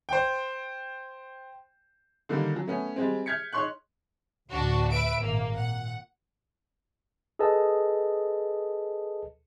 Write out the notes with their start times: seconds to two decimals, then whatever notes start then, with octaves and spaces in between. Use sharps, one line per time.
0.09 C5 G5
2.29 D3 D#3 G3 A#3
2.56 F#3
2.67 A3 B3 C#4
2.96 G3 G#3 C4
3.26 F6 G6 G#6 B6 C#7
3.52 D#4 C#5 C6 C#6 F#6
4.50 D2 A2 D4 F#4
4.90 B4 E5 D7
5.21 G#1 A#2 A#3
5.55 A#2 F#5
7.39 G#4 A4 B4 D#5 A5